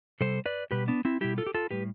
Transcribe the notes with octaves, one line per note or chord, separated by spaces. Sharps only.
C3 G3 A4 C5
B4 D5
B2 G3 G4 B4
B3 D4
C4 E4
B2 G3 E4 G4
F4 A4
G4
F4 A4
A2 G3 G4 B4